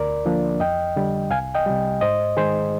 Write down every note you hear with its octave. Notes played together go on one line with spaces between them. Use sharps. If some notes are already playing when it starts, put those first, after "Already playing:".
Already playing: D2 A#4 D5
D3 F3 A#3 D4
F2 D#5 G5
D3 G3
C2 F5 G#5
D#5 G5
C3 G3
G#2 C5 D#5
D#3 G#3 G#4 C5